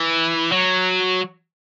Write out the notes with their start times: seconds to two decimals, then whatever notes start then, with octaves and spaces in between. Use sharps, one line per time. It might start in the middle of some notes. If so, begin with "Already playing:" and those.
Already playing: E3
0.52 F#3